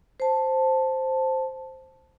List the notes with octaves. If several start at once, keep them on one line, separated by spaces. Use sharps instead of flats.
C5 A5